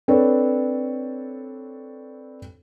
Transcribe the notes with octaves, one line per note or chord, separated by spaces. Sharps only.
C4 D4 A4 B4 C#5